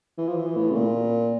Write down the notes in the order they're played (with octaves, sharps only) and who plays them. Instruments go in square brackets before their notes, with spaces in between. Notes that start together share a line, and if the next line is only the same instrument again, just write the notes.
[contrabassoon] E3
F3
E3
A2
C#3
A#2